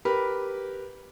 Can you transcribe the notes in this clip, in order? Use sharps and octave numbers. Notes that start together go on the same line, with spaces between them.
G4 A#4 B4 B5